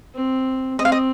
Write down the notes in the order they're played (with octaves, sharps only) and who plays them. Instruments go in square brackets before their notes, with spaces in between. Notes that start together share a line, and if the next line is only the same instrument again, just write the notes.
[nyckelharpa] C4
[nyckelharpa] C4 [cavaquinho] D#5
[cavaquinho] F5
D#5